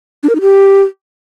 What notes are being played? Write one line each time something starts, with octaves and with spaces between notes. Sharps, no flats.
D4
A#4
D#4
G4